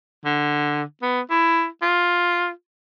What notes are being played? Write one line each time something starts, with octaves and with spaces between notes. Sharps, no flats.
D3
B3
E4
F4